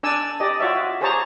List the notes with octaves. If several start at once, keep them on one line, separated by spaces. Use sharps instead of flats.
D4 D5 G#5 E6
G4 D5 D#5
F4 F#4 C#5 D5 E5
G4 G#4 C5 C#5 A5 A#5